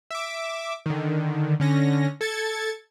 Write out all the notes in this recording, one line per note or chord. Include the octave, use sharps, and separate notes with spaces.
E5 D6
D3 D#3
D3 C#4 A#6
A4 G#6 A6 C#7